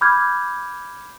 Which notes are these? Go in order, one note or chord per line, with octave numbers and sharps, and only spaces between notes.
B5 D6 F6 G6 G#6